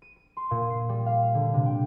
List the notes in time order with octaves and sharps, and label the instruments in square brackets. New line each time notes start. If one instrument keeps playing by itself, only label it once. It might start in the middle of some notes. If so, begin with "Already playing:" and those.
[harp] D#7
D#7
C6
A#2
C7
G3
F5
D3
C3
G5